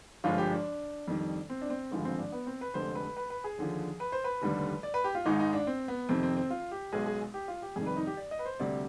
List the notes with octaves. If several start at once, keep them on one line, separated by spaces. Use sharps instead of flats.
G1 G2 F3 G#3 F4
G4
D4
F2 D#3 G3
C4
D4
C4
G#1 G2 D3 F3 G#3
C4
D4
B3
C4
B4
F1 F2 D3 G#3 C5
B4
B4
B4
G#4
D#2 D3 F3
B4
C5
B4
F1 D#2 D3 G3
D5
B4
G4
F4
G#1 G#2 D#3 G#3 D#4
D#4
D4
C4
B3
F2 C3 D#3 C4
C4
C4
F4
G4
B1 B2 G#3 G#4
G#4
G4
F4
G4
F2 C3 D#3 G3 G#4
B4
D#4
G4
D5
D#5
B4
C5
D2 C3 G3 D5